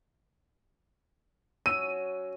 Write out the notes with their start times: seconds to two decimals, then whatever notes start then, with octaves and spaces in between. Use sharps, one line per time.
1.66 F#3 C#4 E6 D#7